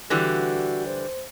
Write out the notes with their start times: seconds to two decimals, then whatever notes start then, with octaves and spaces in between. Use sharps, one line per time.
0.10 D3 E3 G3 F#4
0.87 C5